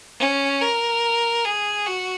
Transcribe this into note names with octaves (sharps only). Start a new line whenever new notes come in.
C#4
A#4
G#4
F#4